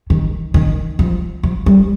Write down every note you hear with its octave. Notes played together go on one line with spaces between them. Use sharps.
D#3
D#3
F3
F3
G3